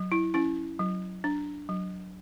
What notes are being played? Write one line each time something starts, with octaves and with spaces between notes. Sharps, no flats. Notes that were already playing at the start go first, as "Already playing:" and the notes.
Already playing: F#3
E4
C#4 E4
F#3
D4
F#3